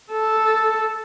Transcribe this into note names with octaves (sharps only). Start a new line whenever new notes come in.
A4